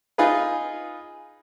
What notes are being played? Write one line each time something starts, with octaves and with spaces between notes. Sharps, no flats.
D#4 F4 G#4 B4